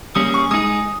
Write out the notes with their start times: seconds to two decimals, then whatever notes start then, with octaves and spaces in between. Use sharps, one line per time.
0.15 G3 A#3 C#4 G#4 D#6
0.34 C#6
0.51 G#3 D#4 G#4 D#6